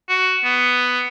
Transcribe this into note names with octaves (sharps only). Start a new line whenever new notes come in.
F#4
B3